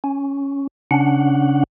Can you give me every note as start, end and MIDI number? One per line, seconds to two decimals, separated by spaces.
0.04 0.67 61
0.91 1.63 49
0.91 1.63 61
0.91 1.63 62
0.91 1.63 78